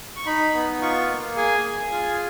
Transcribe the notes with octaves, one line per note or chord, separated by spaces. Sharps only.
C#6
D#4 B5
B3
F4 C#6
A#3
G#4 G#5
G#4
F4